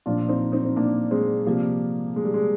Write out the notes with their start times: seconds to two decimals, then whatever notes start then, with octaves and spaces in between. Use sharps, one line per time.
0.06 A#2 F3 D4 F4
0.29 C4 D#4
0.52 C4 D#4
0.65 C4
0.76 A#3 D4
1.11 G#3 C4
1.46 C3 F3 G3 A#3
2.16 G#3
2.25 G3
2.34 G#3